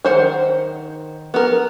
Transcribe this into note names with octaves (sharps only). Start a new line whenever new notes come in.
D#3 C5 F#5
B3 A#4